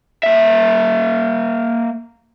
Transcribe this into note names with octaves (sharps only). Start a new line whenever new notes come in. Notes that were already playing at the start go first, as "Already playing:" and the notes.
A#3 E5